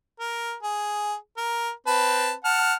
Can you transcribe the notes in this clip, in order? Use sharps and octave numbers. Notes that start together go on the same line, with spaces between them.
A#4
G#4
A#4
C4 B4 A5
F#5 A5 F6